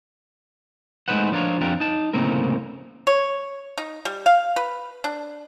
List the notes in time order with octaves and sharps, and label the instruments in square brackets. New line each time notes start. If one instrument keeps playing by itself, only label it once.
[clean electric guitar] G#3 A3 D#4 B4 C5 F#5
F3 D4 F4 A#4 C#5
F2 D4 F4 G4 A#4
D#4 A5
C2 A2 C#3 A#3 C4 A#4
[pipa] C#5
D#4
G3
F5
B4
D4